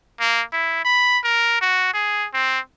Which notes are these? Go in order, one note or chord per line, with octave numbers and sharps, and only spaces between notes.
A#3
E4
B5
A#4
F#4
G#4
C4